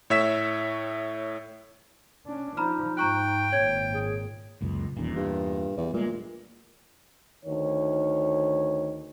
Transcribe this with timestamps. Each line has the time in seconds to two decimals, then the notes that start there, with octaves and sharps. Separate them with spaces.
0.10 A2 C#5 E5 E6 B6 E7
2.26 C#4 D4
2.57 F3 D#4 A#5 B5 F6
2.97 G#2 G5 A#5 C#6 F#6
3.52 G#1 A#2 C#5 G#6
3.94 G#4
4.61 C#2 F#2 A#2
4.97 D#1 E2 A#2
5.16 G2
5.77 E2
5.94 A#2 G3 G#3
7.45 D2 D#3 C#5